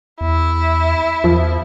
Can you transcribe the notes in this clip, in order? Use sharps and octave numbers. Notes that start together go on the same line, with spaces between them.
E2 E4
E2 F3